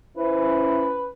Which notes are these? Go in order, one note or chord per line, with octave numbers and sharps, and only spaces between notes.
C#4 E4 B4 C5